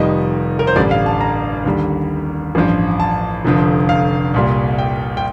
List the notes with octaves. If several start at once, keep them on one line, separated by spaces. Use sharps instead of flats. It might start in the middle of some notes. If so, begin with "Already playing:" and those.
Already playing: F1 F2 D#3 G3 D#5
A#4
C5
A1 G2 D3 G3 D5
F5
A5
A#5
D#2 D3 G3
A1 G2 F3
A5
F1 F2 D3 F3
F5
C2 A#2 G3
G5
G5